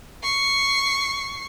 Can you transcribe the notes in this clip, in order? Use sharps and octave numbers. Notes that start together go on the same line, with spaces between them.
C#6 C7